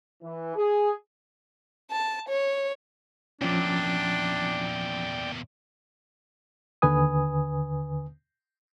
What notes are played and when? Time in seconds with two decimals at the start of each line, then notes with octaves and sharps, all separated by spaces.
0.23 E3
0.56 G#4
1.91 A5
2.29 C#5
3.42 E2 A#2 F3 C#4 D4 D5 G5
6.82 D#2 D3 B4 G#5 D#6